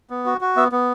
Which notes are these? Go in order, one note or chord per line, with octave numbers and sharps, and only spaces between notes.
B3
F#4
F#4
B3 E5
B3